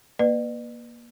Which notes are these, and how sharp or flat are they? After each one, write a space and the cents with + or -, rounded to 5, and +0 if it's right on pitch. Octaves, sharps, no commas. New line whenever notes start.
A#3 +25 B4 +10 D5 +40